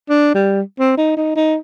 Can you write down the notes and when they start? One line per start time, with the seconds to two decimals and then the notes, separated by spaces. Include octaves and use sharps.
0.09 D4
0.35 G3
0.79 C4
0.98 D#4
1.17 D#4
1.36 D#4